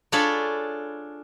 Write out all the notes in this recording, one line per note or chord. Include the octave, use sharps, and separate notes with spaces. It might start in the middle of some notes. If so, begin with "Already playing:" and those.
D4 F4 G#4 A4 C#5 B5